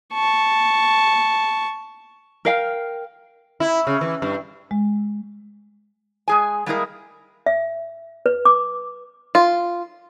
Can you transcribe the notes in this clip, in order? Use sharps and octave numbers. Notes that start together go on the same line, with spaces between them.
A5 C#6
A#4 F5 G5
E4
C#3
E3
G2
G#3
G#3 G#4 G#5
G3 G#3 A#3 E4 G#4 A#4
E5
B4
D6
F4